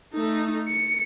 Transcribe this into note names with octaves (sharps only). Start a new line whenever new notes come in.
A3 D#4
C#7